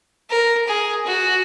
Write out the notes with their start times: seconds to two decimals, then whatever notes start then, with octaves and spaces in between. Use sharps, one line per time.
0.30 A#4
0.67 G#4
1.06 F#4